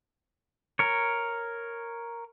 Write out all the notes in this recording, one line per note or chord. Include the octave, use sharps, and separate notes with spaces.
A#4 C#5